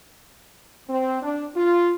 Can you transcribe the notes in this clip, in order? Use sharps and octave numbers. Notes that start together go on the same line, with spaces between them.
C4
D4
F4